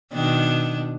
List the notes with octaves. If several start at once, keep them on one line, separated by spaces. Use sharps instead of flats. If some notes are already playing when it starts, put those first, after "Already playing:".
B2 D#3 D4